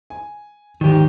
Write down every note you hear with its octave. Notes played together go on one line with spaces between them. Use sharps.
G#5
A#1 D#2 G#2 D#3 G4